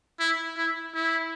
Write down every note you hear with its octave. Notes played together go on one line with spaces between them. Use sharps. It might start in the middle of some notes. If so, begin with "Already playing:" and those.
E4
E4
E4